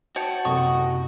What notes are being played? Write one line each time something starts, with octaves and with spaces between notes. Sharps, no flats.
F#4 C#5 G5 A5
F#1 C3 A4 D#5 C#6